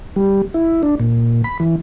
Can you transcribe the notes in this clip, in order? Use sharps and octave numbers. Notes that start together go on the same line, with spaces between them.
G3
E4
D4
A#2
B5
E3